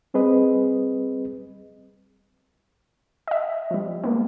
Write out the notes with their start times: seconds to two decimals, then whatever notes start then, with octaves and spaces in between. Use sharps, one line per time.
0.14 G3 C4 G#4 B4 D#5
3.27 D#5 E5
3.71 F3 G3
4.04 G#3 A#3 B3